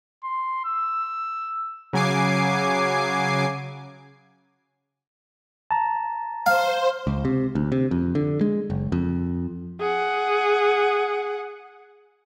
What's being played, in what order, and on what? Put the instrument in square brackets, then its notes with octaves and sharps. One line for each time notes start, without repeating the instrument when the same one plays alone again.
[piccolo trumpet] C6
E6
[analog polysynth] C#3 F#3 G#5 D6 C7
[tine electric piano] A5 A#5
[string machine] C5 [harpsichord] F5
[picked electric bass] C#2
C3
D2
C3
F2
D3
G#3
F#1
F2
[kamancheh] G#4 F#5